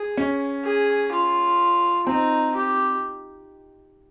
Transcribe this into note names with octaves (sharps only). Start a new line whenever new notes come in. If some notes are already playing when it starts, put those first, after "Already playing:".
Already playing: G#4
C#4
G#4
F4
C4 D#4
G4